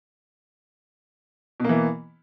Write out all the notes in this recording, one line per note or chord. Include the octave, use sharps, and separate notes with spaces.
B2 E3 A#3